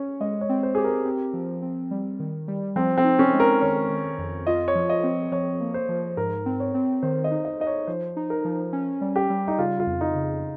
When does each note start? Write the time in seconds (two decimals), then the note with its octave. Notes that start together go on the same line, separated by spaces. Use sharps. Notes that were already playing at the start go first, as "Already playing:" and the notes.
Already playing: C#4 C#5
0.20 G#3 D#5
0.41 C#5
0.49 C4
0.63 C5
0.75 G4 G#4
0.84 A#4
1.05 C4
1.33 F3
1.62 C4
1.91 G3
2.20 D#3
2.48 G3
2.76 F3 C4
2.98 C4
3.04 D#4
3.19 C#4
3.34 G#3
3.40 A#4
3.62 D#3 C#5
3.90 D#3
4.18 F2
4.47 F4 D#5
4.68 C#5
4.75 F3
4.90 D#5
5.04 C4
5.32 F3 C#5
5.60 A#3
5.74 C5
5.89 F3
6.17 G#2 A#4
6.46 C4
6.60 C#5
6.74 C4
7.03 D#3 C5
7.24 D#5
7.31 D#4
7.45 D#5
7.60 D#4 D#5
7.67 C#5
7.87 F3 C5
8.16 D#4
8.30 A#4
8.45 F3
8.73 C#4
9.01 G3
9.16 G4
9.30 G3
9.48 D#4
9.58 C#3 F4
9.80 F4
9.87 F2
10.01 D#4
10.15 C#3